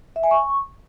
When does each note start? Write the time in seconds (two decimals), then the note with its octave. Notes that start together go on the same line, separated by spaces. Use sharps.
0.16 E5
0.23 G#5
0.31 C#6